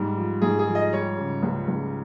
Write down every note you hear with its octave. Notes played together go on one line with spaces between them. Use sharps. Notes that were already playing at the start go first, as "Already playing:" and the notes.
Already playing: G#2 G3
F3
G#2 G#4
G#4
F3
D#5
G3 C#5
C#3
C#2
C#2